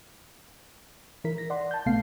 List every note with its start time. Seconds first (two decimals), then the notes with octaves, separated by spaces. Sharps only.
1.24 E3 E4 A#4 B6
1.38 A#6
1.50 D5 F#5 C6
1.71 A5 G6
1.86 A#1 C3 A3 B3 F5 C7